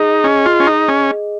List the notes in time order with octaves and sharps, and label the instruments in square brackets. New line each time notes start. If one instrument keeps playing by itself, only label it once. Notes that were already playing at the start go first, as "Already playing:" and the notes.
Already playing: [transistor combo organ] D#4 [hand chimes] G#4 D#5
[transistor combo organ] C#4
F4
C#4
D#4
C#4